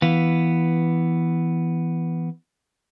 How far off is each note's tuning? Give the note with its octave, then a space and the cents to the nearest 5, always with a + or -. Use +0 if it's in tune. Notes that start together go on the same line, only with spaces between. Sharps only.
E3 +0 B3 +0 F5 +0